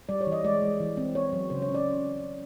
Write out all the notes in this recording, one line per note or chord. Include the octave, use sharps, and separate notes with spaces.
G3 D5
C#5
E3
D#5
G#3 D5
G#3
E3
C4
B3 C#5
F#3
C#3 C5
C#5
C#4
D5